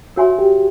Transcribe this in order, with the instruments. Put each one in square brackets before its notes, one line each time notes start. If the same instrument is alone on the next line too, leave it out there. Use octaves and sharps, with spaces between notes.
[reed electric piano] F#4 [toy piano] A#4 C#5 E5 G#5 C6
[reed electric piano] G4